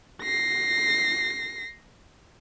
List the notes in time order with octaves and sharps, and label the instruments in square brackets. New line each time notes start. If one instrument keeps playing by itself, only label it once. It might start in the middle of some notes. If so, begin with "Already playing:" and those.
[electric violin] A#6 C7